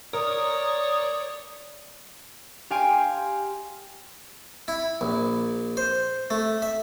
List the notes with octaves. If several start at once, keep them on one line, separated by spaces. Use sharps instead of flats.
A#4 C#5 D5 D#6
G4 F5 G#5 C6 D7
E4
A#1
C5
A3
E5